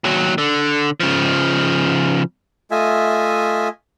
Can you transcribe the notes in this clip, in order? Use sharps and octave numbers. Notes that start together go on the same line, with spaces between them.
D#2 F#3
D3
C#3 F3
A3 F4 D#5 E5 G#5